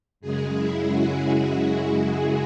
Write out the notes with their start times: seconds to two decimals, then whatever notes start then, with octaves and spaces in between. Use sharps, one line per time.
0.20 F#2 C#3 G#3 G#4
0.54 E4
0.88 F#4